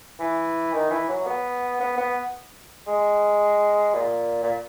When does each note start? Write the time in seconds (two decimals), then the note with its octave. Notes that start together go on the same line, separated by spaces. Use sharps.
0.20 E3
0.73 D#3
0.90 E3
1.08 F#3
1.26 B3
1.80 B3
1.98 B3
2.87 G#3
3.94 A#2
4.43 A#2